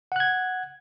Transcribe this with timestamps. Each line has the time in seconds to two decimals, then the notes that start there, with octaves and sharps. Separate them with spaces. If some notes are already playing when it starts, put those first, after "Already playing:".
0.12 F#5
0.16 F#6
0.20 G#6